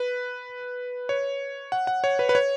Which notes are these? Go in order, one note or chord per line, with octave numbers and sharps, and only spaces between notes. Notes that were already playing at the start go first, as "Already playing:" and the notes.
Already playing: B4
C#5
F#5
F#5
C#5
B4
B4
C#5